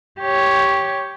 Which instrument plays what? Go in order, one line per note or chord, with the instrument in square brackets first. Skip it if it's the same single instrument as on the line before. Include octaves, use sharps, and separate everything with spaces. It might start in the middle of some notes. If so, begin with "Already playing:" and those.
[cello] G4 C#5